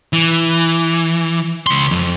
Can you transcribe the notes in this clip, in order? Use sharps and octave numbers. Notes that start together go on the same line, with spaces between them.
E3
C#2 C6
F2